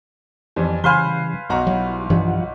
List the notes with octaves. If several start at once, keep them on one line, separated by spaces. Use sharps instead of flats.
F2 E3 G3 C4
C#3 E3 G3 B4 C5 F5 G#5 G7
B1 F#4 D#5 A#5
F#3 G3 E4
G2 E3 F3 G3 F4 F#5